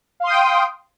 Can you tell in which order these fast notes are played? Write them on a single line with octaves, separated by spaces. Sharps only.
F5 C6 D#6 G5